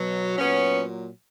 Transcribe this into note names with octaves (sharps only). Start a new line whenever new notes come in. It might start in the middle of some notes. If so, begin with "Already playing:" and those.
Already playing: B2 F#3
A#2 F#3 B3 C#4